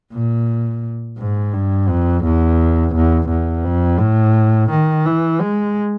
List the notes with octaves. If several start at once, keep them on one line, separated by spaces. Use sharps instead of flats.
A#2
G#2
G2
F2
E2
E2
E2
F2
A2
D#3
E3
G#3